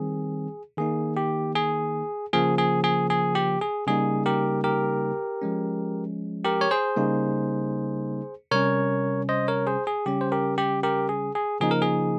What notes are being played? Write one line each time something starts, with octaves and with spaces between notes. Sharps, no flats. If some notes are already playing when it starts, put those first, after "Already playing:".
Already playing: D#3 G3 C4 G#4
D#3 A#3 D#4 G#4
G4
G#4
C#3 F3 A#3 G#4
G#4
G#4
G#4
G4
G#4
C#3 G3 A#3 D#4 G#4
G4 A#4
G4 A#4
F3 G#3 C#4
G4 A#4
C#5
G#4 C5
C#3 G3 A#3 D#4
C3 G3 C#4 A#4 C#5
C5 D#5
A#4 C#5
G#4 C5
G#4
C#3 G3 C#4 G4
C5
G4 A#4
G4
G4 A#4
G#4
G#4
C#3 F3 A#3 D#4 G#4
A#4
G#4